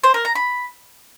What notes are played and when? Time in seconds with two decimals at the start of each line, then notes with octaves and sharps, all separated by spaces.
0.04 C5
0.14 A#4
0.25 A#5
0.35 B5